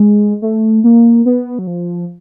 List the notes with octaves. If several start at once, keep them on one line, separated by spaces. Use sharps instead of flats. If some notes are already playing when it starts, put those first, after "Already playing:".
Already playing: G#3
A3
A#3
B3
F#3
F3